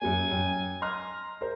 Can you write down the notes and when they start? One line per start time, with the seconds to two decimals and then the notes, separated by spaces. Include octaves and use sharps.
0.02 F#2 F#3 A#3 G#5
0.31 F#2 G5
0.82 D#5 A#5 C6 F6
1.41 A#4 C5